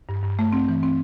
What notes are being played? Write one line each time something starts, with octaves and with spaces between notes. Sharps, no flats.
G2
G2
A3
C4
E3
C4